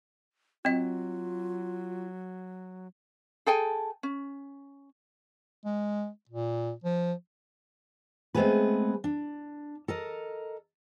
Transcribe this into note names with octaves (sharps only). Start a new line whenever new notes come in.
F#3 C4 F4 D#5
G#4 A4 G5 G#5
C#4
G#3
A#2
F3
G#3 A3 B3 C4 G#4 B4
D4
A4 A#4 D#5